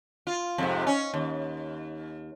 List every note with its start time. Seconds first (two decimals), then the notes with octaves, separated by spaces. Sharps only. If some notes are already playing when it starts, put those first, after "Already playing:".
0.27 F4
0.58 F2 G#2 C3
0.87 C#4
1.14 D#2